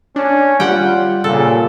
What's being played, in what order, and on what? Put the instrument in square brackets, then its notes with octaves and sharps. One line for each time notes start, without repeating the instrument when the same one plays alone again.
[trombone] C#4 [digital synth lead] D4
[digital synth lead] G3 [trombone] F4 [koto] F#5 G5
[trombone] A#2 [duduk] C#3 [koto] A4